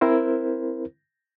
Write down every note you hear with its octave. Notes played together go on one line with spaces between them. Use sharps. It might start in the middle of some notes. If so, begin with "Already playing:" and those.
C4 E4 A#4 C5